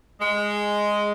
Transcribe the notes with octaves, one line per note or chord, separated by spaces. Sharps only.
G#3